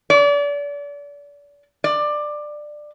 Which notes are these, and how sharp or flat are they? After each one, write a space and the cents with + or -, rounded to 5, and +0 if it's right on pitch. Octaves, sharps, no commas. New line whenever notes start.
D5 -35
D5 +15